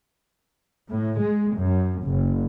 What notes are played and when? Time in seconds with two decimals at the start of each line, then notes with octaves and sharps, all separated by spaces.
0.90 A2
1.21 G#3
1.57 F#2
2.04 F#1